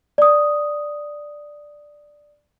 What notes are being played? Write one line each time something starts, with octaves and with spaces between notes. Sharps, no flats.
D5 D#6